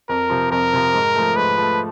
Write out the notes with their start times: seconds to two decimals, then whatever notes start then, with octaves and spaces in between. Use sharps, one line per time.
0.09 F2 A#4
0.30 C3 F3
0.51 F2 A#4
0.73 C3 F3
0.94 G#2
1.15 F3 A3
1.36 G#2 B4
1.57 F3
1.62 A3